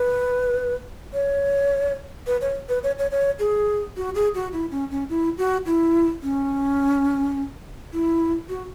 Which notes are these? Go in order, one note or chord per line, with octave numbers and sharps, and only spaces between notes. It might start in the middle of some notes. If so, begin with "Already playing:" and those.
Already playing: B4
C#5
B4
C#5
B4
C#5
C#5
C#5
G#4
F#4
G#4
F#4
E4
C#4
C#4
E4
F#4
E4
C#4
E4
F#4